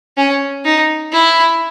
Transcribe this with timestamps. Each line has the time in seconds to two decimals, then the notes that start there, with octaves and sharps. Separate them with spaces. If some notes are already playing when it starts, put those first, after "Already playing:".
0.17 C#4
0.65 D#4
1.12 E4